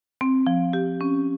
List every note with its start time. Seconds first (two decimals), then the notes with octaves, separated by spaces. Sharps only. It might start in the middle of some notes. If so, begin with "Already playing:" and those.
0.21 C4
0.47 F3
0.73 G4
1.01 C#4